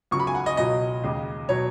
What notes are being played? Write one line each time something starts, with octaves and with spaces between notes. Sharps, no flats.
C#2 C#3 F#3 C#6
B5
G#5
F#5
D#5
C#2 B2 F#3 D#5
D#2 C#3 G#3
B2 F#3 C#5